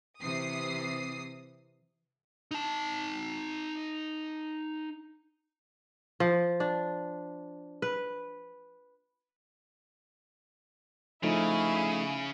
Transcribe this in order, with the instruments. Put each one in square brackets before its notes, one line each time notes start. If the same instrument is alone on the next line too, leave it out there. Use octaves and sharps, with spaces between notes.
[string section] C3 E3 D#6 C7
[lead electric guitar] D#4 A5
[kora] F3
D4
B4
[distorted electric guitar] C#3 [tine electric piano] F3 A3 D#4 [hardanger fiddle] E4 G#4